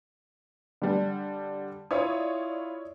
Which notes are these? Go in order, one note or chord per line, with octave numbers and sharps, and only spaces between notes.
D3 G3
E4 F4 C#5 D5 D#6